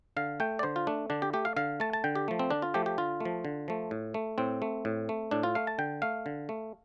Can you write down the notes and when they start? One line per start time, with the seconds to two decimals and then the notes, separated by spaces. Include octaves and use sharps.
0.17 D3 F5
0.40 A3 G5
0.59 D5
0.63 D3 C5
0.76 F4
0.87 A3 D4
1.10 D3 D4
1.22 G4
1.33 A3 G4
1.45 F5
1.56 D3 F5
1.80 A3 A5
1.93 A5
2.04 D3 G5
2.15 G4
2.28 F3 A3
2.39 C4
2.50 D3 D4
2.62 F4
2.74 F3 A3 G4
2.86 G4
2.98 D3 F4
3.20 F3 A3
3.45 D3
3.68 F3 A3
3.91 A2
4.14 A3
4.38 A2 C4
4.62 A3
4.85 A2
5.09 A3
5.31 A2 D4
5.43 F4
5.55 A3 F5
5.67 A5
5.78 D3 G5
6.02 A3 F5
6.26 D3
6.49 A3